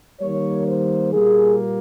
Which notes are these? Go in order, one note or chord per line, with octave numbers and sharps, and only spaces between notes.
D#3 G3 A#3 C#5
C5
A#2 G3 A#3 G#4